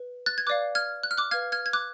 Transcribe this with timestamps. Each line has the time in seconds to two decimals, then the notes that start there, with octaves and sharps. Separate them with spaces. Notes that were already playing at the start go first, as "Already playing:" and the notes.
Already playing: B4
0.26 F#6 A6
0.38 G#6
0.47 B4 D5 F5 D6 F#6
0.75 F6 G#6
1.03 F#6
1.11 F6
1.18 D6 F#6
1.31 B4 F5 F6 G#6
1.52 F6 G#6
1.66 G#6
1.73 D6 F#6